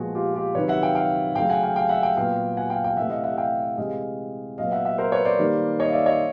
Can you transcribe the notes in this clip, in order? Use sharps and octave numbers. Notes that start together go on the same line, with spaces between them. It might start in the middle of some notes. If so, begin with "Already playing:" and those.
Already playing: A#2 F3 G#3 B3 F#4 G#4
F4 G4
F4 G4
C3 D#3 F#3 B4 C#5
E5 F#5
F5 G5
F5 G5
C#3 F#3 A3 F5 G5
F#5 G#5
F5 G5
F5 G5
E5 F#5
F5 G5
A#2 F#3 B3 F5 G5
F#5 G#5
F5 G5
F5 G5
C3 E3 A3 E5 F#5
D#5 F5
E5 F#5
F5 G5
C3 E3 G#3 D#5 F5
A#2 F#3 B3 D#5 F5
E5 F#5
E5 F#5
A#4 C5
B4 C#5
C5 D5
D#3 G3 A#3
C#5 D#5
F5
D5 E5
C#5 D#5